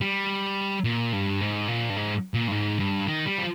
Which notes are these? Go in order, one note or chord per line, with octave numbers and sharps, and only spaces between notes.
G3
A#2
G2
G#2
A#2
G2
G#2
A#2
G2
G#2
G2
D#3
G3
F3